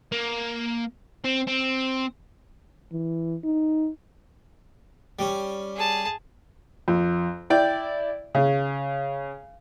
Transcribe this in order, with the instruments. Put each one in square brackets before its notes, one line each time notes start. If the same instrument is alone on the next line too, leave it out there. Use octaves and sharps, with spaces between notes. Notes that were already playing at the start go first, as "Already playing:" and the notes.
[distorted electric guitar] A#3
C4
C4
[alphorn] E3
D#4
[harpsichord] G3 C#4
[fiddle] G#4 A5
[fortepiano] F2
E4 D5 G5
C#3